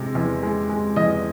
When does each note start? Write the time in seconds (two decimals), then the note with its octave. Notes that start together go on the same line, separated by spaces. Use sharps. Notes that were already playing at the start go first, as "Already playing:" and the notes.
Already playing: C3 G#3
0.15 E2
0.43 G#3
0.69 G#3
0.96 E2 D#5